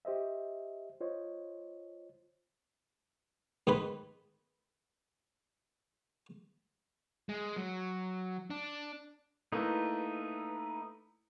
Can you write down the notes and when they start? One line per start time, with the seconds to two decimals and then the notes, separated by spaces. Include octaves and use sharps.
0.05 G4 C5 D#5 E5
1.01 F4 C5 C#5 D#5
3.67 G#2 D#3 G#3 G#4 B4 B5
7.29 G#3
7.56 F#3
8.50 D4
9.52 A3 A#3 D#4 E4 B4